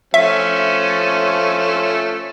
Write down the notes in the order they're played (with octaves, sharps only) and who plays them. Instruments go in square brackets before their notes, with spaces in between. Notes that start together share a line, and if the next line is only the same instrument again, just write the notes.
[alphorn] F3 [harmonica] A3 C#4 [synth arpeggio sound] E5